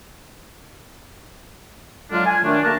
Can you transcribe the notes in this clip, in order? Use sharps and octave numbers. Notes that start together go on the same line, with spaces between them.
D3 F#3 G#3 D4 F4
G#5
F#2 D#3 A3 D4
D2 A#3 A#4 A5